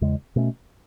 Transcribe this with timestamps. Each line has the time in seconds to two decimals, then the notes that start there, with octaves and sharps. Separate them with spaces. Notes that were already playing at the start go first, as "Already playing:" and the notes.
0.01 E2 C#3 G#3
0.36 B2 A3 C#4